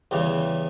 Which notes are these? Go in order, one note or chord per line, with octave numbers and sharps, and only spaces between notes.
E2 C#3 E3 G3 G4